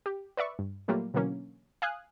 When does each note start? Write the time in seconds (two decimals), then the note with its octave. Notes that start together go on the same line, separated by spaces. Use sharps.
0.06 G4
0.37 B4 D5 E5 C#6
0.59 G2
0.88 A#2 F#3 G3 A3 A#3 F4
1.14 B2 D3 E3 F#3 A#3 C#4
1.82 F5 G#5 D#6 F#6